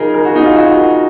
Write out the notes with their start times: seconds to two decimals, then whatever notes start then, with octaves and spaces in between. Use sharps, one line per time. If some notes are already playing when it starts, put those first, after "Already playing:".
Already playing: C#3 F#3 D#4 F4 G#4 A#4
0.14 A#4
0.25 F#4
0.36 D#4
0.46 F4
0.56 F#4